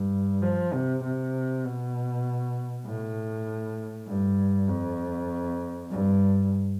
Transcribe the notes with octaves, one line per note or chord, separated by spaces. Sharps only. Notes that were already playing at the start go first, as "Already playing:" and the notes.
Already playing: G2
F3
C3
C3
B2
A2
G2
F2
G2